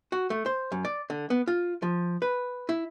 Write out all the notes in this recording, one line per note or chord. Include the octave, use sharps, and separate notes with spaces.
F#4
A3
C5
F#2
D5
D3
B3
F4
F3
B4
E4